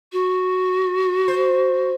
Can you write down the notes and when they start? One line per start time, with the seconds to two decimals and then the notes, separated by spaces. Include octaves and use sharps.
0.12 F#4
1.28 C5